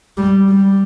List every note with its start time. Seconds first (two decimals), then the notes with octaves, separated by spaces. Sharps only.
0.17 G3
0.49 G3